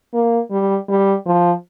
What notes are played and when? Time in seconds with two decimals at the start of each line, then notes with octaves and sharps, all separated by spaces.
0.13 A#3
0.51 G3
0.89 G3
1.26 F3